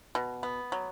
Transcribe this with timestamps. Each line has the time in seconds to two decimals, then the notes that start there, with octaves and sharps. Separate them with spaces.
0.15 B2
0.43 B3
0.72 F#3